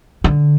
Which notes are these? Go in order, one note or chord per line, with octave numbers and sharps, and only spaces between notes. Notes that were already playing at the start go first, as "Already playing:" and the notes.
D3